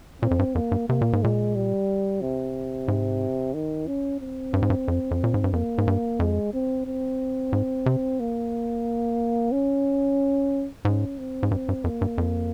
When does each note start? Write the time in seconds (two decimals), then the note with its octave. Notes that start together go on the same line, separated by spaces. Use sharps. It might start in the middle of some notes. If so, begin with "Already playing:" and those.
0.22 A#2 C4
0.31 F2
0.39 G2
0.55 F2 A#3
0.72 G2
0.89 C3 A#3
1.01 A#2
1.13 G#2
1.23 A#2 G#3
1.55 G3
2.21 C3
2.88 G#2
3.54 D#3
3.87 C#4
4.21 C4
4.53 G2
4.62 G#2
4.70 G2
4.88 F2
5.11 F2
5.24 A#2
5.34 G#2
5.44 G2
5.53 F2 A#3
5.78 G#2
5.87 G2
6.19 F2 G#3
6.53 C4
6.86 C4
7.53 G#2
7.86 C3
8.20 A#3
9.52 C#4
10.85 G#2 C#4
11.18 C4
11.43 G#2
11.51 G2 C4
11.69 G2
11.84 F2 A#3
12.01 G2
12.18 F2